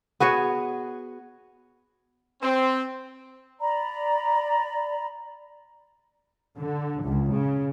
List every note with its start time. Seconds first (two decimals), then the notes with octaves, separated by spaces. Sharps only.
0.20 B3 F#4 G#4 C#5
2.42 C4
3.60 D5 A#5 B5
6.59 D3
7.05 C#2
7.35 C#3